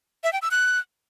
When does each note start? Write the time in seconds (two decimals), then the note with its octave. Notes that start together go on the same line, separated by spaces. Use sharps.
0.24 E5
0.33 G5
0.42 E6
0.51 F#6